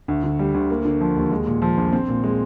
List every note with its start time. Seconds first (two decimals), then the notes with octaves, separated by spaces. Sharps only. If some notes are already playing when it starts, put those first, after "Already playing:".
0.08 D2
0.24 D3
0.39 G3
0.54 D2
0.70 A#3
0.85 D3
1.01 F3
1.16 D#2
1.31 G#3
1.47 A#2
1.62 F3
1.78 A#1
1.92 C4
2.08 A#2
2.24 G#3